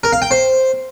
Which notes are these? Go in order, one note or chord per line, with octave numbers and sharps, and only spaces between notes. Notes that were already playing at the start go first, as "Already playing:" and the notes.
A#4
F5
G5
C5